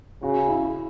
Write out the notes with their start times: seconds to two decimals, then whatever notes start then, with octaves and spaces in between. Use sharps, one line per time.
0.22 C#3 F#4
0.48 E4